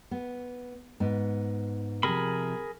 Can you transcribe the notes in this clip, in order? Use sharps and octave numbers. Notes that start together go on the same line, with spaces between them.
B3
G#2 B3
C3 F3 G#4 A#4 B5